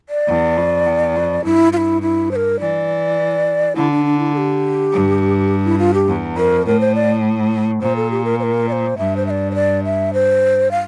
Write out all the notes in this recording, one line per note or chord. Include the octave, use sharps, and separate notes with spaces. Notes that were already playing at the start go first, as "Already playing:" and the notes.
D5
E2
F2
E2
F2
G2 E4
F4
E4
E4
C5
A#4
E3 D5
D3 E4
D4
D4
E4
A4
G4
G2
E4
F4
G4
E2
F2 A#4
A2 A#4
C5
D5
A#2 C5
A4
G4
A#4
C5
A#4
D5
C5
G2 E5
C5
E5
D5
C5
D5
E5
C5
F5